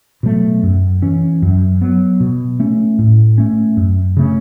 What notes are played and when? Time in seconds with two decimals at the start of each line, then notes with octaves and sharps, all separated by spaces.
0.23 B2 F#3 A3
0.63 F#2
1.02 E3 C#4
1.42 F#2
1.81 F#3 B3
2.20 B2
2.60 A3 C#4
2.99 A2
3.38 A3 C#4
3.77 F#2
4.17 C#3 A3 C#4